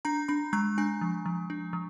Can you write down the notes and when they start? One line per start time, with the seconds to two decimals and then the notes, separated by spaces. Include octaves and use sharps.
0.05 D4 A#5
0.28 D4 B5
0.53 G#3 A#5
0.78 D4 G#5
1.01 F3
1.26 F3
1.50 D4
1.73 F3